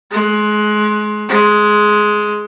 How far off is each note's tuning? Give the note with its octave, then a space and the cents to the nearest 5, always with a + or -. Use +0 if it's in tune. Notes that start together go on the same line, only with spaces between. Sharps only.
G#3 +25
G#3 +10